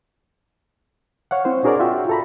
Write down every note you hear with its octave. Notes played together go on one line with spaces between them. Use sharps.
C#5 F5 F#5
C4 E4 C5
D4 F#4 G#4 A#4 C#5 D5
F4 F#4 E5 G5
A4 A#5 B5